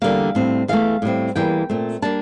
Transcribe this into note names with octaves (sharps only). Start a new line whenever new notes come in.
E2 D3 G3 A#3 F5
A2 G3 C4
E2 E3 A3 F5
A2 G3 C4
E2 E3 G3 A#3 G5
A#2 A3 C4
G3 A#3 D4 A5